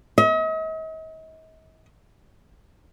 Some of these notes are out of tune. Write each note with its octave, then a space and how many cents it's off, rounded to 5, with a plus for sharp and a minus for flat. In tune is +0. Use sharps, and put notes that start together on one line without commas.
D#5 +45